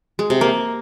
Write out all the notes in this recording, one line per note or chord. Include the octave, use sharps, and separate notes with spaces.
G#3
C3
A#3